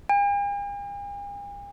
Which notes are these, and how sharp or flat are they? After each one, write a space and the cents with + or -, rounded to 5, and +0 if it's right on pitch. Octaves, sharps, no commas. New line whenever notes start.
G#5 -45